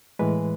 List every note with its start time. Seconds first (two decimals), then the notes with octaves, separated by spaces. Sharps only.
0.19 A2 E3 G#3 B4